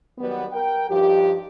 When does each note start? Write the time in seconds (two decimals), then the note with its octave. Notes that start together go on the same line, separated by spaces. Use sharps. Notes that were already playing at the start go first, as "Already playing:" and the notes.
0.18 D#3 F#3 G3 B3
0.52 A#4 G5
0.90 G2 F3 D#4 G4